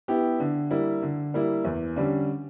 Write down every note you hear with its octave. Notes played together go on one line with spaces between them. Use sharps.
B3 E4 G4
D3
G3 A#3 E4
D3
G3 A#3 E4
E2
D3 G3 C#4